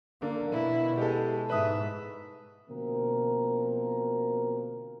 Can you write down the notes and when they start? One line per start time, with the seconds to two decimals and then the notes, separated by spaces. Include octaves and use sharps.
0.22 D3 A#3
0.52 B2 E4
0.97 G#3 G4 A4
1.50 G#2 B4 E5 D#6
2.70 B2 D3 F3 A#3 C4 A#4